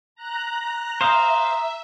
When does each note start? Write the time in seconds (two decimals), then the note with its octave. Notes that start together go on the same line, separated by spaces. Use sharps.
0.15 A#5 F#6
1.01 C5 E5 F5 A#5 D#6